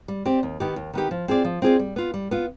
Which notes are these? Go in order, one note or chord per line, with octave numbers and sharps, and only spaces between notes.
G3
C4 G4 D5
D#2
D#3 B3 D#4 G4
D#2
D#3 B3 D#4 G4
F3
C4 F4 G#4 D5
F3
C4 F4 G#4 D5
G3
B3 F4
G3
B3 F4